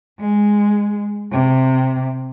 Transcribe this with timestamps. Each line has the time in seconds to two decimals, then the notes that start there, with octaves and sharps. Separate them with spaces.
0.20 G#3
1.32 C3